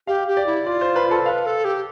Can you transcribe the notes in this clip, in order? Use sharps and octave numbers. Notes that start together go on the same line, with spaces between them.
G4 F5
G4
D5
E4
F4 D5
C5
B4
A4
B4 F5
A4
G4